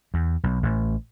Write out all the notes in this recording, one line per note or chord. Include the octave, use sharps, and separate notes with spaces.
E2
B1
A1